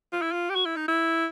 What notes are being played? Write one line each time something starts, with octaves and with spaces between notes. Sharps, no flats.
F4
E4
F4
G4
F#4
E4
D#4
E4